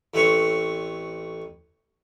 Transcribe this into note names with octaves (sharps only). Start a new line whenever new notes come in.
A1 A3 C4 B4 C#5 C#6